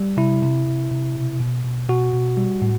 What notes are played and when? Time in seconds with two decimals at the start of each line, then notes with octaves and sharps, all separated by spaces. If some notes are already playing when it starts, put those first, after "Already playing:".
Already playing: G3
0.17 C3 E4
0.42 C3
0.67 C3
0.91 C3
1.15 B2
1.40 B2
1.65 B2
1.89 B2 F#4
2.13 B2
2.37 G3
2.62 A2